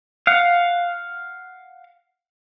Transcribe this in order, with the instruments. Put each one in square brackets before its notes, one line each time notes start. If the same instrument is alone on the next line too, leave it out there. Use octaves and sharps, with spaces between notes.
[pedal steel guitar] F5 F#5